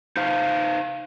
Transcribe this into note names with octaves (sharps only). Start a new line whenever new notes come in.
D#4 C5 F5